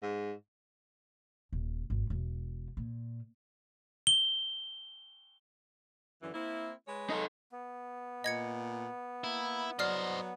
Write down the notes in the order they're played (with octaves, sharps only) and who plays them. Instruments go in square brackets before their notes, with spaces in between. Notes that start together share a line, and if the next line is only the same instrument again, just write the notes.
[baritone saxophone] G#2
[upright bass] D#1
G#1
E1
A#2
[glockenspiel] G7
[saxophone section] F#2 D3 E3
A#3 C4 E4
G#3 B4 C#5
[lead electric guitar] D#4 A4
[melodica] B3
[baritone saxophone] A#2 [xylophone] D#5 G#6 C#7
[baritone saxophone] A#3 [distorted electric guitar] E4
[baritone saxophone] F#3 [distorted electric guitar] C5 D#5 [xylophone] D5 F6 C7